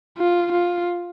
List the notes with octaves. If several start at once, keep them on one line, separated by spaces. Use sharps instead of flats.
F4
F4